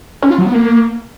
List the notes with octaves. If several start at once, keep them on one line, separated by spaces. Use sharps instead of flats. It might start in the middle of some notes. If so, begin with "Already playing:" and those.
C#4
F4
F#3
B3
A#3